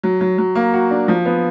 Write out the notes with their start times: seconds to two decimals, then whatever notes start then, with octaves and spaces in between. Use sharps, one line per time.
0.03 F#3
0.21 F#3
0.38 F#3
0.55 A#3
0.73 F#4
0.91 D4
1.08 F3
1.26 B3